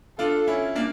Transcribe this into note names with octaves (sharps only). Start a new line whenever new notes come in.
D4 F4 A4
C#4 E4
A#3 D4